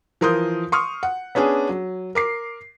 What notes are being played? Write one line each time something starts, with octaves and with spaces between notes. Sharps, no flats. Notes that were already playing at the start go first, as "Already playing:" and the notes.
E3 F3 A#4 C6 D#6 G6
C6 C#6 D#6 F6
F#5
B3 C#4 D4 G#4
F#3
A#4 D6 C7